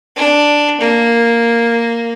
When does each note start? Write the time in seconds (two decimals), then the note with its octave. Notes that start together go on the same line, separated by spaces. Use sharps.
0.16 D4
0.80 A#3